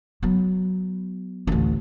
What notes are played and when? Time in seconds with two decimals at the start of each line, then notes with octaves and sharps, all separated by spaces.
0.23 F#3 B3
1.47 A1 D2